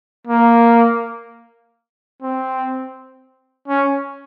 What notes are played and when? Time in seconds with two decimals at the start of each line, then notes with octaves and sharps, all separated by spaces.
0.27 A#3
2.22 C4
3.68 C#4